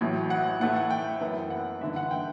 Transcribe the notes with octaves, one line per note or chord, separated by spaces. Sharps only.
A1 A2 F#3
F#5
A2 E3 A3 E4 F#5
F#5
G5
F#2 E3 B3 E4
F#5
A1 G2 D3 E5
F#5
G5